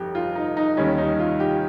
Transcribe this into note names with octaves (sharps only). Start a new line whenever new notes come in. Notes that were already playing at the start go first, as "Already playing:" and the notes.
Already playing: G1 F2 G4
F4
D#4
D#4
D#2 D#3 G3 C#4
D#4
F4
G4